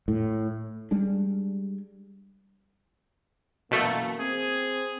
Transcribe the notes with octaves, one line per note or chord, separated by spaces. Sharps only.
A2
G3 G#3 D4
F#2 B2 E3 A3 A#3
C4 G#4